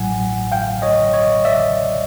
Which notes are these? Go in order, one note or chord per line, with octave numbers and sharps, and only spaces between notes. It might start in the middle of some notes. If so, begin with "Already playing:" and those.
Already playing: A1 A2 F#3 F#5 G#5
F5 G5
C#5 D#5
C#5 D#5
D5 E5